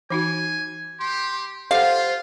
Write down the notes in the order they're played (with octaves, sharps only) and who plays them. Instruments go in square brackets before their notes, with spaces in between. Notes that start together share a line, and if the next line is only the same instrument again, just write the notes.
[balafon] E3 D#4 F#4 [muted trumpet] G#5
[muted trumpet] G4 [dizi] C6
[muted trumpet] F4 [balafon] G4 A4 F#5 [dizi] C5 [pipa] F5